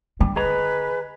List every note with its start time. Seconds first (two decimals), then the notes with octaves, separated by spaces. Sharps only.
0.20 D3 G3
0.36 G#4 B4 D#5 A#5